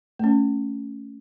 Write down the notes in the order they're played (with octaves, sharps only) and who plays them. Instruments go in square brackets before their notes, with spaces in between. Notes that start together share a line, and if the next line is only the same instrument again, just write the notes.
[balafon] A3 C#4